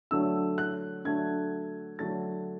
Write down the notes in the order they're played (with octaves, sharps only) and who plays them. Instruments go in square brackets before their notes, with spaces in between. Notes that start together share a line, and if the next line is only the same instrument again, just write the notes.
[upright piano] D3 F#3 A3 D4 E6
F#6
D3 F#3 A3 D4 G#6
D3 F#3 A3 D4 A6